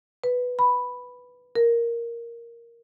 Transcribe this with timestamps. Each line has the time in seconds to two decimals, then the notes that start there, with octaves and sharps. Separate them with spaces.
0.24 B4
0.59 B5
1.55 A#4